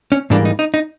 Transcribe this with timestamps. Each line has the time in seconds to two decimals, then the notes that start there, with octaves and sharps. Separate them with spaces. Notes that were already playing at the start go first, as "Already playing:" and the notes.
0.12 C#4
0.30 G#2 E3 G3 A#3 D4
0.45 D#4
0.59 D#4
0.74 D#4